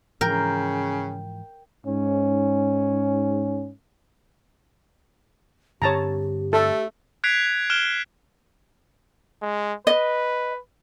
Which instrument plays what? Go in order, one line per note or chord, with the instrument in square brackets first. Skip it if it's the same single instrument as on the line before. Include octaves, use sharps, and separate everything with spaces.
[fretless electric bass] G#2 E3 F3 [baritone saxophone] C#3 [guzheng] A#4 [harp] G5
[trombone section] G#2 C#4
[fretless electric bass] G2 D3 C4 [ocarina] G4 [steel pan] C#5 A5 A#5
[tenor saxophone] A3 [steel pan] A4
[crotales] F#6 G#6 B6 C7 D7 F7
F#6
F6 F#6 D7 E7 G7
[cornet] G#3
[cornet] B4 [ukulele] D#5